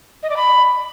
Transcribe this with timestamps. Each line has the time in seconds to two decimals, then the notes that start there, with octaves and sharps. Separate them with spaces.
0.23 D#5
0.30 D5
0.36 B5